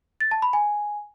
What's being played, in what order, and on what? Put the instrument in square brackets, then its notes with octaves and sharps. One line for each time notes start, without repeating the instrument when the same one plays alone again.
[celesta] A6
A5
B5
G#5